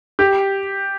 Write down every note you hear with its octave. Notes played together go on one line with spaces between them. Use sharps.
G4